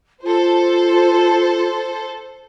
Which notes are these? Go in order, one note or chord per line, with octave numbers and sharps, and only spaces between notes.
F4 A4 C5